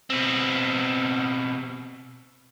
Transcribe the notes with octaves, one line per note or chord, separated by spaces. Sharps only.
B2 C4